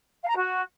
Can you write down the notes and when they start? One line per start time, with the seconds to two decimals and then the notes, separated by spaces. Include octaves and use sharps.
0.22 F5
0.29 A#5
0.35 F#4